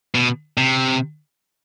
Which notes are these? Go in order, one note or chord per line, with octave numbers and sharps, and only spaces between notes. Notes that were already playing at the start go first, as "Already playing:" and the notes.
B2
C3